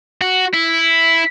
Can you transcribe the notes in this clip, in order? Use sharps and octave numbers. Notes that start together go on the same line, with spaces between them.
F#4
E4